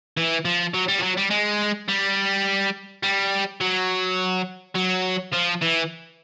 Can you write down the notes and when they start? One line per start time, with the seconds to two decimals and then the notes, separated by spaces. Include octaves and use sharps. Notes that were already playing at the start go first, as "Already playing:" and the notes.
0.17 E3
0.45 F3
0.74 F#3
0.89 G3
0.99 F3
1.03 F#3
1.18 G3
1.31 G#3
1.89 G3
3.03 G3
3.61 F#3
4.75 F#3
5.33 F3
5.61 E3